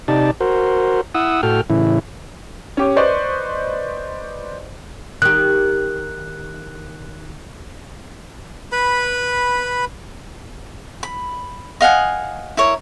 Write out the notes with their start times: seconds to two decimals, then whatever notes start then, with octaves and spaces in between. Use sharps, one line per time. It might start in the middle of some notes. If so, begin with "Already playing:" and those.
0.08 C3 D#4 G4 D5 A5
0.41 F#4 A#4 C5
1.15 E4 F#5 D#6 E6
1.43 A2 F#4 A4 G5 F6
1.70 A2 C#3 E3 E4
2.77 C#4 G4
2.96 B4 C5 D5 D#5 C#6 F#6
5.22 D#3 G4 F#6
8.72 B4 B5
11.03 B5
11.81 D#5 F5 F#5 G#5
12.57 E4 A#4 C#5